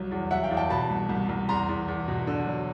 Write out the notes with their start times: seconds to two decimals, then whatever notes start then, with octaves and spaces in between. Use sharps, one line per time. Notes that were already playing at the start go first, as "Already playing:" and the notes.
Already playing: C2 F#3
0.11 E2
0.31 F#3 E5 F#5
0.44 F5 G5
0.51 E2
0.57 G5 A5
0.70 B2 A5 B5
0.90 C2
1.09 C2
1.29 C2
1.49 E2 A#5 C6
1.69 E2
1.88 E2
2.08 B2
2.27 D3
2.47 F#3